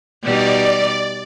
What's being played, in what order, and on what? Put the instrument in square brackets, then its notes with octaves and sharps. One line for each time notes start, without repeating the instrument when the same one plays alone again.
[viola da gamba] B2 G3 D#4 [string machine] D5